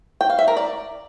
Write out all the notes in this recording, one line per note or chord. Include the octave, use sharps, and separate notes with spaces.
G5
F5
E5
A#4
D5